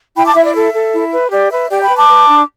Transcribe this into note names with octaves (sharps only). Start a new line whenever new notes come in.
E4 G5 B5
A5 D6
E4 E5
D5
A4 E5
A4
E4
B4
G4 D5
B4 E5
G4 D5 G5
G5 B5
B4
A5 D6
B4
D4